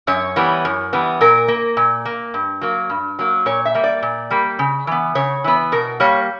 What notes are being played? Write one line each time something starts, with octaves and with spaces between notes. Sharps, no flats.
F#2 C#5
E3 G3 B3
F#2
E3 G3 B3
A#2 A#4
A#3
A#2
A#3
G2
F#3 A#3
G2
F#3 A#3
A#2 C#5
E5
G3 A#3
D5
A#2
G3 A#3
C#3
E3 B3
C#3 C#5
E3 B3
B2 A#4
G3 A#3 C#5